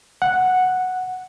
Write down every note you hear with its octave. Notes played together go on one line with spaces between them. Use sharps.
F#5